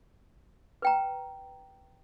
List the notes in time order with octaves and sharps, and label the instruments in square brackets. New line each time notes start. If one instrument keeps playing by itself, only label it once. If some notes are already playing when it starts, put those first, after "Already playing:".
[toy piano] B4 G5 A#5